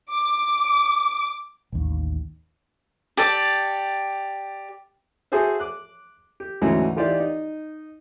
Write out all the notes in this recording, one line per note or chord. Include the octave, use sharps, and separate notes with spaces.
D6
A1 D#2
G4 A4 D5
F#4 G#4 A4 C5 E5
D6 F#6
G4
D2 G#2 C#3 E3 F#3 A3
E3 D#4 F4 G4 C5 D5
D#4